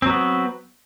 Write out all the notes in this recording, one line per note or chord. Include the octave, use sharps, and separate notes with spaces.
F#3 B3 C4